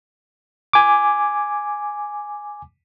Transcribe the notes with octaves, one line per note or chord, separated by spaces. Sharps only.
G#5 D6